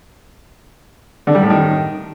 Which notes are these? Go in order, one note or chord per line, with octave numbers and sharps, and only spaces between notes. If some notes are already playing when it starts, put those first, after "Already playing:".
D3
G3
A2
D#3